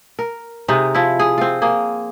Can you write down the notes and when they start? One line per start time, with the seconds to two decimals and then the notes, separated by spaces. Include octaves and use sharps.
0.19 A#4
0.68 C3 G#3 D#4
0.95 F3 E4
1.19 G#4
1.38 C4 F4
1.62 A#3 G#4